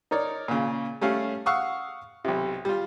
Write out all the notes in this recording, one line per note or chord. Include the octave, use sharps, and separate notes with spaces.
D#4 A#4 C#5 D5
A#2 C#3
G3 A3 C#4 F5
F5 F#5 C#6 D#6 E6
B1 C3
G3 F4